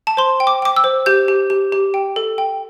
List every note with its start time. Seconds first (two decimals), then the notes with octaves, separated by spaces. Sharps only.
0.07 A5
0.17 C5 C6
0.40 G5
0.47 D6
0.62 G5 D6
0.76 E6
0.84 C5
1.06 G4 G6
1.28 G4
1.50 G4
1.72 G4
1.94 G5
2.16 A4
2.38 G5